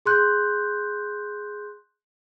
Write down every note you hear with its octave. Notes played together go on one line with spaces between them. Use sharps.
G#4 C6 F#6 G6